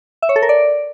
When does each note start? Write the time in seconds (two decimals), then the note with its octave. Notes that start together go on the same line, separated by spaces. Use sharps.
0.22 E5
0.29 C#5
0.36 A4
0.42 A#4
0.49 D5